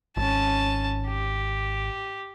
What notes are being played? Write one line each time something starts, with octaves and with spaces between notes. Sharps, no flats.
G#1 C#4 A5
G4